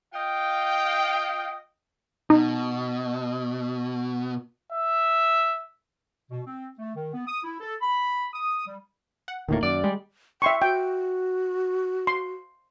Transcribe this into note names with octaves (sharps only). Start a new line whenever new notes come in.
F4 D#5 F5 G5
B2 D#4
E5
B2
C4
A3
D#3
B3
D#6
E4
A4
B5
D#6
G3
F#5
D1 D2 A2 D#3 A#3
F#2 D5
G3 G#3
E5 G5 C6 C#6
F#4 G5
C6